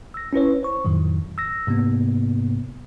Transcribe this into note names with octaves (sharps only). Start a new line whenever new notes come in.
E6 A#6
C#4 E4 B4 C#5
C5 C#6
F2 A2 D#3 F#3
E6 A#6
G#2 C3 A#3 B3